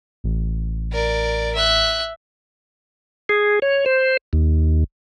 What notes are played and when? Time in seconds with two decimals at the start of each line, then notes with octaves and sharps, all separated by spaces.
0.24 A1
0.92 A#4 D5
1.55 E5 F#6
3.29 G#4
3.62 C#5
3.86 C5
4.33 D#2